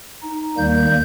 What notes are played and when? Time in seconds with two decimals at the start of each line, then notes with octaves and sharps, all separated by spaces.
0.22 D#4
0.58 D#2 D#3 G3 A#3 G6